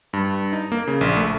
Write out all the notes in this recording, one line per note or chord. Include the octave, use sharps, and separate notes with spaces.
G2
D#4
A#3
C#3
A#1
A3